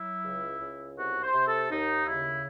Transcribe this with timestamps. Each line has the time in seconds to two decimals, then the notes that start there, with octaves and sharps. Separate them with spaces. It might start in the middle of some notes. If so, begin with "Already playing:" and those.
Already playing: F#3 E4
0.24 C#2
0.60 C#2
0.97 C2 F#4
1.22 C5
1.33 C3
1.46 A4
1.70 D#2 D#4
2.06 C#3 E4